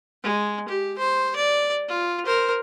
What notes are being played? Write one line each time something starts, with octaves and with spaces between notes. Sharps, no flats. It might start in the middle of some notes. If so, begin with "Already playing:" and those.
G#3
G4
C5
D5
F4
A#4 C5